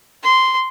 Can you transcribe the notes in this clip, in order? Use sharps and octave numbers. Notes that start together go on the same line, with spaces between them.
C6